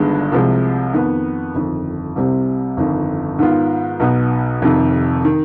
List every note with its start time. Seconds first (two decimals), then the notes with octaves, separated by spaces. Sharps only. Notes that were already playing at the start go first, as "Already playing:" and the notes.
Already playing: G1 G2 D#3 G#3 B3
0.32 C2 C3 F3 G#3
0.93 F2 D#3 B3
1.54 G1 F2 D#3
2.16 C2 C3 G3 C4
2.77 G1 F2 D#3
3.39 G#2 D#3 B3 F4
4.00 B1 B2 B3 D#4
4.61 F1 F2 C3 D#3
5.25 D#3